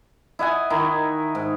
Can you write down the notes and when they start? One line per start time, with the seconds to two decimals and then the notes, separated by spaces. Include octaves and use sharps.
0.39 E4 D#5 F#5 G#5
0.70 D#3 D#4 E4
1.35 G#2